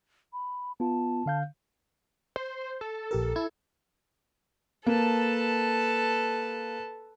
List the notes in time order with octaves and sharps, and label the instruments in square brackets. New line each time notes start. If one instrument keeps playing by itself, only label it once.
[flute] B5
[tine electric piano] B3 F4 [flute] A5
[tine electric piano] D3 F5 G6
[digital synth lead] C5
A4
[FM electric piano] A#1 G4 A#4
E4 G#6
[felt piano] A#3 [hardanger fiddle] A4 [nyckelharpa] B4 A5